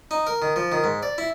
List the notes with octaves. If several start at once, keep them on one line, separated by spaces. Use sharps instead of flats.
D#4
A#4
D#3
F3
D#3
G#2
D5
E4